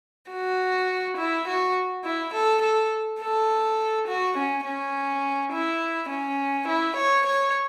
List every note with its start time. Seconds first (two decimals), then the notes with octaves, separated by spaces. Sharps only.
0.30 F#4
1.17 E4
1.47 F#4
2.04 E4
2.33 A4
2.62 A4
3.21 A4
4.07 F#4
4.36 C#4
4.65 C#4
5.52 E4
6.10 C#4
6.68 E4
6.97 C#5
7.26 C#5